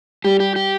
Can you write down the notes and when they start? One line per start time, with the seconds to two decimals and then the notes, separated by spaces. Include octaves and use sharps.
0.25 G3 G4
0.40 G4
0.56 G4